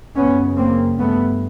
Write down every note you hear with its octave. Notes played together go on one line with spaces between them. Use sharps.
F#2 C#3 B3 C#4
A#3 C4
G2 A3 B3